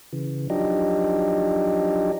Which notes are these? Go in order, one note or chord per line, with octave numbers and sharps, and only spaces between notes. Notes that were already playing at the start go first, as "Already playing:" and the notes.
C#3 E3
F3 F#3 D4 D#4 G4 D#5